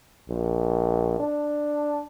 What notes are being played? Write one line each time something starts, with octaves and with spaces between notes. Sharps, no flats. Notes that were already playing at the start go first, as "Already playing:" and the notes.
A#1
D4